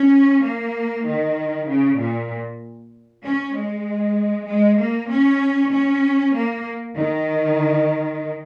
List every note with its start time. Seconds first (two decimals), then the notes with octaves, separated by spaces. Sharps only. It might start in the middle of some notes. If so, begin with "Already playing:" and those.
Already playing: C#4
0.44 A#3
1.06 D#3
1.68 C#3
1.99 A#2
3.23 C#4
3.54 G#3
4.46 G#3
4.77 A#3
5.09 C#4
5.70 C#4
6.33 A#3
6.95 D#3